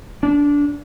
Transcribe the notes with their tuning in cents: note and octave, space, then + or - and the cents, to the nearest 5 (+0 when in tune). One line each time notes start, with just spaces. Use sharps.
D4 -20